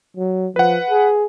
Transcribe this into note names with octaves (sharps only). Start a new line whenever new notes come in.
F#3
F3 B4 F#5
G#4